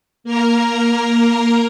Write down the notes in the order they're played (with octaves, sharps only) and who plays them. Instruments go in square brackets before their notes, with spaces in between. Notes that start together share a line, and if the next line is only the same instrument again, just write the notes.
[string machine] A#3 A#4 A#5